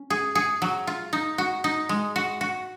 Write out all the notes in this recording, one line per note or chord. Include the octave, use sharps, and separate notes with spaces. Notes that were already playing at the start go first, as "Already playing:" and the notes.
Already playing: C#4
G#4
G#4
F#3
F4
D#4
F#4
D#4
G#3
F#4
F#4